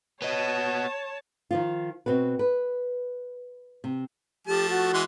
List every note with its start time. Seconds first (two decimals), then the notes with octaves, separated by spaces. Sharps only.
0.22 B3 C#5 D#5 A5
1.51 D#3 F3 F4
2.06 B2 C4 F#4 B4
2.39 B4
3.84 C3
4.47 F3 A3 G4 A5
4.70 F#4
4.93 E3 G#3 C6